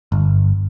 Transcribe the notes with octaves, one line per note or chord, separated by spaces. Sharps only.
G1